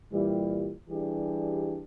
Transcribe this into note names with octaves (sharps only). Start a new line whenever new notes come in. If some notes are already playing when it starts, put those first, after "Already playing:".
A#2 E3 G3
E3 G3 D4 G4 G#4